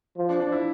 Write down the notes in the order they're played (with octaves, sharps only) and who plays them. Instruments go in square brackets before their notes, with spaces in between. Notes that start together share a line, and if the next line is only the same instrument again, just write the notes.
[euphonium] F3
[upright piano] D4
D4
E4